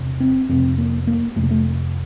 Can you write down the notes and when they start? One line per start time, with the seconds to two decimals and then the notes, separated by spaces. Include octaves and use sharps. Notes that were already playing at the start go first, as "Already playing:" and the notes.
Already playing: E2 C3
0.20 C4
0.49 F2 C3 C4
0.78 A#3
1.07 A#3
1.36 F2 C3 A3
1.43 A#3
1.51 A3